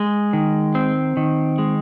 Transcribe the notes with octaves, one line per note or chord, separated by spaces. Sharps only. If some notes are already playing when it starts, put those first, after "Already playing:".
Already playing: G#3
D#3
C4
D#3
G#3